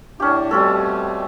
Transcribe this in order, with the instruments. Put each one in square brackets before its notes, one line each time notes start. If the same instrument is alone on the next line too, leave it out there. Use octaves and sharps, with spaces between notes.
[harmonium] A2 D4 [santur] C#4 G4
[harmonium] B2 G3 A3 [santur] C4 C#4 A4